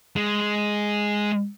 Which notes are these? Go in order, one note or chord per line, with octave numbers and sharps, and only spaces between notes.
G#3